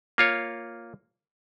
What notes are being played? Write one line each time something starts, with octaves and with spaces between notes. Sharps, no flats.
A#3 F4 C#5